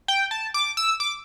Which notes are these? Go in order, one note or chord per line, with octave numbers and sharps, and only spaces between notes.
G5
A5
D6
E6
D6